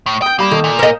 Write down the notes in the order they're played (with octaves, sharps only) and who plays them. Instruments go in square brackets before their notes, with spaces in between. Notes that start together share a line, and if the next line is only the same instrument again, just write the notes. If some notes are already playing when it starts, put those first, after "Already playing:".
[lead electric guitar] A2
[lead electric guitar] G5 [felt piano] D#6 G6
[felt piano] G3 B5 E7 [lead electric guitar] A#3
[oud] D#3 [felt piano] A4
[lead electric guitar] A#2
[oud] A#4 D#5